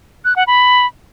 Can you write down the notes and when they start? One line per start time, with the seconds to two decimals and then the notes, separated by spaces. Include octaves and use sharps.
0.25 F#6
0.36 F#5
0.47 B5